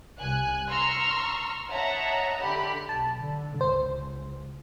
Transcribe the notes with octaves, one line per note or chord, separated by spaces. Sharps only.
C2 G#5 F#6
A#5 C6 C#6 E6 F6
C#5 D#5 E5 F#5 A5 A#5
D3 G4 B5
B1 A5
D3
C#2 C5